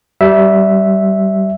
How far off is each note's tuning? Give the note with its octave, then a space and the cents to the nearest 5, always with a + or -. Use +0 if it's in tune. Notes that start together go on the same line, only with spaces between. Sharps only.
G3 -20 E5 +0